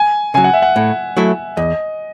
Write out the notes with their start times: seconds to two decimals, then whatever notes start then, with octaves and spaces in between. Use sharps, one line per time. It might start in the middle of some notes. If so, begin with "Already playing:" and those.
Already playing: G#5
0.34 C#3 F#3 G#5
0.44 F#5
0.54 E5
0.62 F#5
0.76 A2
1.17 F#3 A3 E4
1.57 E2 D#5